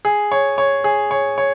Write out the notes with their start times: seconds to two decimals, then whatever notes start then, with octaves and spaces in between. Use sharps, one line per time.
0.05 G#4
0.32 C#5
0.58 C#5
0.84 G#4
1.11 C#5
1.38 C#5